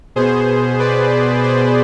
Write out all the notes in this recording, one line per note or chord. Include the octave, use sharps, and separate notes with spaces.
B2 B3 G#4 C5
B4 D5
G#4 C5